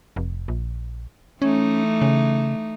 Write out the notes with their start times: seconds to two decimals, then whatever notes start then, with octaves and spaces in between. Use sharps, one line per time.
0.16 F1
0.48 A#1
1.42 E3 A3 C#4 D#4
2.01 C#3